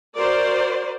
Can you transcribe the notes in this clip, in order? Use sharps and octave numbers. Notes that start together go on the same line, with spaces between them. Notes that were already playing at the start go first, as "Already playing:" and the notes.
F#4 A#4 C5 D5